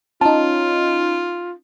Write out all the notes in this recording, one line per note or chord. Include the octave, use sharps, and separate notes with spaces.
C#4 D#4 F4 A5